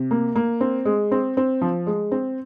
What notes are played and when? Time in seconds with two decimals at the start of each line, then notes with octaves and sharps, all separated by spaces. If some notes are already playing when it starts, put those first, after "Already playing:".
Already playing: C3
0.11 A#3
0.35 A#3
0.61 C4
0.85 G#3
1.11 C4
1.37 C4
1.62 F3
1.87 G#3
2.12 C4